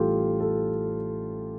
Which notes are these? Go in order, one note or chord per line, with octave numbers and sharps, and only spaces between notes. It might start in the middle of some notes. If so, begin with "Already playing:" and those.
Already playing: A1 A2 E3 G3 F4 G4 A4
A4